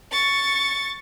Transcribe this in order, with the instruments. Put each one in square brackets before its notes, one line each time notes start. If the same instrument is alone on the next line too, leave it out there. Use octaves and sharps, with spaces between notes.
[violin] C#6 A6